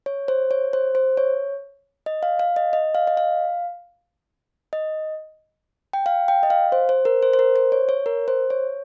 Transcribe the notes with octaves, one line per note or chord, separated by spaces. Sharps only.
C#5
C5
C#5
C5
C5
C#5
D#5
F5
F5
D#5
D#5
F5
D#5
F5
D#5
G5
F5
G5
D#5
F5
C5
C5
A#4
C5
C5
A#4
C5
C#5
C#5
A#4
C5
C#5